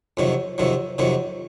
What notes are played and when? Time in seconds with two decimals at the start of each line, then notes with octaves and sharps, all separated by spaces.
0.17 F2 C3 D#3 F#3
0.58 F2 C3 D#3 F#3
0.98 F2 C3 D#3 F#3